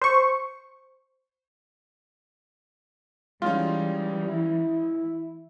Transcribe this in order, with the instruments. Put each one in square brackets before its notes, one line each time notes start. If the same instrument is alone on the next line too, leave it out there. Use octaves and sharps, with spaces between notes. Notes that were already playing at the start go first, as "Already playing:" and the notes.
[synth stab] C5 C#6
[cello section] E3 [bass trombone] G3 [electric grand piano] G#3 C#4 D#4 [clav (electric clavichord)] F4
[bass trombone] E4